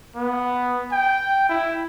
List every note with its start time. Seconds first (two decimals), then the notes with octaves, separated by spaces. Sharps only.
0.16 B3
0.92 G5
1.50 E4